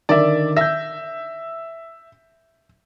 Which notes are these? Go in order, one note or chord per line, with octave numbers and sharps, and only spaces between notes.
D3 D#3 A#4 D5 E5
E5 G6 A#6